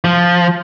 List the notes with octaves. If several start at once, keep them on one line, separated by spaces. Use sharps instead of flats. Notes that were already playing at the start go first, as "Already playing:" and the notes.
F3